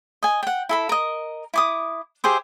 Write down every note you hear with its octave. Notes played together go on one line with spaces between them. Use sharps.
D#5 G#5
F#5 G5
E4 A4 B5
A#4 D#5
E4 D6 D#6
G4 G#4 C5 E5